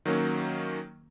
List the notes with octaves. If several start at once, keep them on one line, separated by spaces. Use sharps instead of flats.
D#3 F#3 A#3 C#4